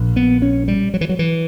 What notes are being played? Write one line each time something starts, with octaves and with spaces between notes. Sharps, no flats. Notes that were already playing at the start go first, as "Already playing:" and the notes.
Already playing: A#1 A#2
B3
C#4
G3
F#3
E3
F#3
E3